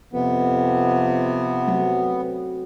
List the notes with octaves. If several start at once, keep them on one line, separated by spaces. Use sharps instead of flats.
F2 C3 B3
F#3 A3 C4